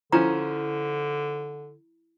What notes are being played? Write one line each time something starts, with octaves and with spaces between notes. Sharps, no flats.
D3 F3 C#4 E4 A#5